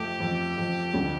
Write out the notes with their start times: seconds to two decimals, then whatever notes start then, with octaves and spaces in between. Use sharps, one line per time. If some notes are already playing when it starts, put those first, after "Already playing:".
Already playing: F2 A3 G4
0.20 F2
0.57 F2
0.94 D2